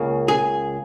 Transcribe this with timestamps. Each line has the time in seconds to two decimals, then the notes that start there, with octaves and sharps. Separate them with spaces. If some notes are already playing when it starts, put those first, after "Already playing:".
Already playing: C#2 C#3 A#3
0.28 G#4